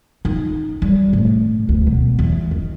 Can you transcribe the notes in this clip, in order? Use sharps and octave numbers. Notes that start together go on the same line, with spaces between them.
D#4
G3
A2
D2
B2
E2
D#3